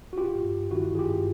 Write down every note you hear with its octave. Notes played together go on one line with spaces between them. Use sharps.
F#4
G#1 F4 G4
G2
G#1
D#3 E4 F#4
G#1
G#4
F4 G4
G2